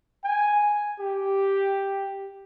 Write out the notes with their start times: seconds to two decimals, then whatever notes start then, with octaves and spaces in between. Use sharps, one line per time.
0.24 G#5
1.00 G4